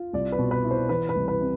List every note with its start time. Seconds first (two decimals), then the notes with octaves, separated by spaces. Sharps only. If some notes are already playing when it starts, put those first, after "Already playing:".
Already playing: F4
0.13 C2 D5
0.32 B4
0.39 B2
0.51 B4
0.64 E4
0.71 C5
0.89 E3 B4
1.09 B4
1.16 C2
1.28 B4
1.41 C3